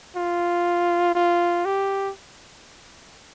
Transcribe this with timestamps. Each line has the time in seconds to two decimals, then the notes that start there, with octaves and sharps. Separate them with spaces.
0.16 F4
1.15 F4
1.65 G4